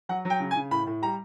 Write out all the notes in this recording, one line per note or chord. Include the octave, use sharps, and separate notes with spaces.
F#3 F#5
F#3
G5
C#3
G#5
C#3
A2 B5
A2
G3 A#5